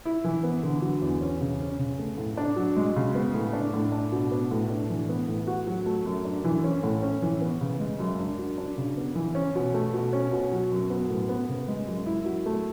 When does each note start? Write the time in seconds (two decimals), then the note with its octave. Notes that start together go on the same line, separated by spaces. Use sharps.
0.05 E4
0.24 E3
0.43 B3
0.63 D3
0.82 F#3
1.02 E2
1.21 C#4
1.41 C#3
1.60 C#4
1.79 C#3
1.99 A3
2.17 A2
2.37 D4
2.56 F#3
2.76 G#3
2.96 C#3
3.15 B3
3.34 A2
3.53 D4
3.73 A2
3.92 D4
4.12 B2
4.31 B3
4.51 A2
4.70 D4
4.90 E3
5.09 B3
5.28 A2
5.47 F#4
5.67 F#3
5.86 A3
6.06 F#2
6.25 D4
6.44 E3
6.64 C#4
6.83 A2
7.03 C#4
7.22 E3
7.41 B3
7.61 C#3
7.80 G#3
8.00 F#2
8.19 D4
8.38 F#3
8.58 D4
8.77 C#3
8.97 B3
9.15 E3
9.35 C#4
9.55 B2
9.74 A3
9.93 B2
10.13 C#4
10.32 B2
10.51 F#3
10.71 F#2
10.90 B3
11.10 A2
11.29 B3
11.49 C#3
11.68 G#3
11.87 F#2
12.06 E4
12.25 F#3
12.46 A3